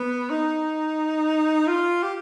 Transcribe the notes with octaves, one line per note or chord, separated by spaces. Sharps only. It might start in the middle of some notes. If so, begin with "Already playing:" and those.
Already playing: B3
D#4
F4
G4